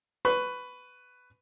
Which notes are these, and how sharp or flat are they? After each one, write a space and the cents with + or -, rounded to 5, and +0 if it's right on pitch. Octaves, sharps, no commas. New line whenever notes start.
B4 +10 C#6 +0